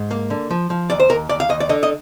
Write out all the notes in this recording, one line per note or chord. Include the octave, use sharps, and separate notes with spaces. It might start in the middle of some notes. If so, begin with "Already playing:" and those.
Already playing: G#2
A#3
D3
F3
F3
D#2 D5
C5
D#2 A#4
D#2 D5
F5
D#2 D#5
D5
D3 D#5
D#5